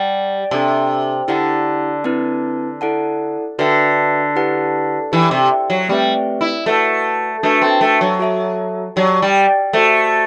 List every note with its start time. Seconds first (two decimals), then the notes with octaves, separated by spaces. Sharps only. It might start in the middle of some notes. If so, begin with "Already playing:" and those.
Already playing: G3 G4 D5 F#5 A5
0.51 C3 D4 A4 E5 A5
1.28 D3 E4 G4 D5 F#5 A5
2.04 C4 E4 B4 D5 A5
2.81 E4 A4 D5 F#5 A5
3.59 D3 F#4 B4 E5 G5
4.36 E4 G4 B4 F#5 A5
5.12 E3 G4 D5 G5
5.31 C3
5.70 F#3
5.88 G3 A3 C4 G4 B4 E5
6.41 E4
6.66 A3 F#4 B4 F#5 A5
7.43 A3 D4 F#4 B4 E5 A5
7.62 C4
7.81 A3
8.01 F#3
8.19 F#4 A4 E5 A5
8.96 F#3 G4 D5 A5
9.22 G3
9.73 A3 F#4 C5 E5